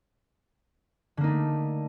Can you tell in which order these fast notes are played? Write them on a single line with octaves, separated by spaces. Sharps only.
D3 A#3 D#4 A3